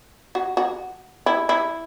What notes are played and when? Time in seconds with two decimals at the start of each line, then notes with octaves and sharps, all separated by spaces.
0.35 F#4
0.57 F#4
1.26 E4
1.49 E4